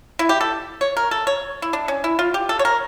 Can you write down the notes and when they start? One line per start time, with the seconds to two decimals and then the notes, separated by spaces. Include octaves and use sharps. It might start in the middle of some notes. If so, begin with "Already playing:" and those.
0.19 E4
0.29 G4
0.41 A4
0.81 C#5
0.97 A#4
1.11 A4
1.27 C#5
1.62 E4
1.73 D4
1.88 C#4
2.04 E4
2.19 F4
2.34 G4
2.49 A4
2.59 C#5
2.65 A#4